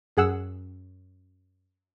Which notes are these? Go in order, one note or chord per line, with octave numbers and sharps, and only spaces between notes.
F#2 G#4 F#5 E6